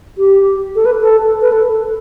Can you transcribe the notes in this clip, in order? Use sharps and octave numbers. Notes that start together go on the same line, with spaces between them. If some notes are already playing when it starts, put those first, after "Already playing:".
G4
A4
B4
A4
B4
A4